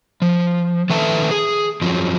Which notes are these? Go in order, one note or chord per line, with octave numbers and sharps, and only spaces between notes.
F3
D#3 A4 B4 E5 A5
G#4
F#2 F3 F#3